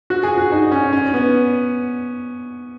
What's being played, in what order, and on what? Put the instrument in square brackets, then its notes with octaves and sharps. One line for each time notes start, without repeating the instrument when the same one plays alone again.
[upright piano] F#4
G#4
F#4
D#4
C#4
C#4
B3